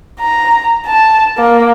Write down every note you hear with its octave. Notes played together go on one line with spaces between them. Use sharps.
A#5
A5
A#3